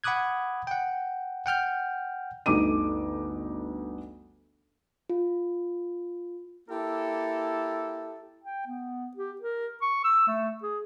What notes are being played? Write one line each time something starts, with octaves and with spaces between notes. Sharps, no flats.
F#5 B5 D6 D#6 F#6 G#6
F#5 G5
F#5 G5 F6 G6
G1 D2 D#4 D6 D#7
F4
A#3 E4 G4 A4
G5
B3
G4
A#4
C#6
E6
A3
G#4